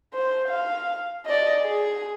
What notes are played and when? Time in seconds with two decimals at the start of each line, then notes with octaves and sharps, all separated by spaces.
0.14 C5
0.48 F5
1.25 D5 D#5
1.63 G#4